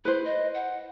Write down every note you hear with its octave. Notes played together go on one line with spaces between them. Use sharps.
E4 B4 C5
D#5
F#5